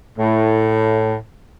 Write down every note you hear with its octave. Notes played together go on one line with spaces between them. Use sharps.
A2